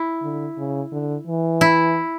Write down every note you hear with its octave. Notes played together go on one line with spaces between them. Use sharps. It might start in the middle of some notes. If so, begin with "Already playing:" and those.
Already playing: E4
D3
C#3
D3
E3
E4